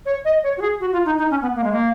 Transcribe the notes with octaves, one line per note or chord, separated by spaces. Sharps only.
C#5
D#5
C#5
F#4
G#4
F#4
F4
D#4
D#4
C#4
B3
A#3
G#3
A#3